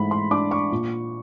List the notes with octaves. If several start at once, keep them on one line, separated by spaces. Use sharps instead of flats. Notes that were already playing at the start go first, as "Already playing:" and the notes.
Already playing: G#2 E3 A3 B5
C6
D4 D6
C#6
A#2